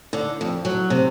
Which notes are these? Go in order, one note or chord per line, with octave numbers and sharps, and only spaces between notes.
D3
F2
F#3
C3